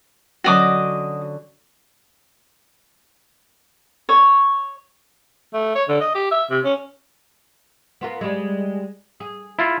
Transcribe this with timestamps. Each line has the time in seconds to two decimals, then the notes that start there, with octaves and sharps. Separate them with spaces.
0.44 D3 F#3 C#4 F#4 D#5 D6
4.09 C#5
5.54 A3
5.75 C#5
5.88 D3
6.01 D#5
6.15 G4
6.31 E5
6.50 C3
6.64 C#4
8.01 B3 F4 A#4
8.21 G3 G#3
9.20 G#4
9.59 E4 F4